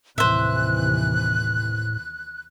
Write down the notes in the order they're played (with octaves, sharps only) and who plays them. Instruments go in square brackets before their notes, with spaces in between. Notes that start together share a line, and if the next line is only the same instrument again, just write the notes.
[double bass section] D#2 C3 E3 [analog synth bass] A2 [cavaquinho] C5 E5 [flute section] F#6